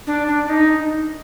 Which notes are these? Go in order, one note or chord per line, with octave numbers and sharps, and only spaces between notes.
D4
D4
D4
D#4